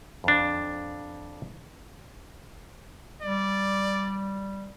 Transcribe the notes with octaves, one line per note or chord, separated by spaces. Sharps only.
F2 D4
G3 D5